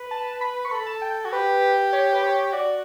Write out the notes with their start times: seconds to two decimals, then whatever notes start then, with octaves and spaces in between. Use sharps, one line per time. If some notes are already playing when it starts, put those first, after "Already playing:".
Already playing: B4
0.11 A5
0.41 B5
0.65 C#6
0.67 B4
0.71 A4 B5
0.86 A5
1.02 G5
1.25 F#4
1.32 G4 B4
1.93 C#5
2.13 B4
2.23 C#5
2.53 F#4 D5